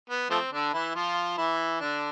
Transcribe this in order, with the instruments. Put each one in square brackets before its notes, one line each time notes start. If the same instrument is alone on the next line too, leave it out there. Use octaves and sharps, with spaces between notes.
[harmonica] B3
F3 A3 C4
D3 D4
E3 E4
F3 F4
E3 E4
D3 D4